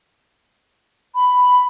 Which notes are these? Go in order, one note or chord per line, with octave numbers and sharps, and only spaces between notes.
B5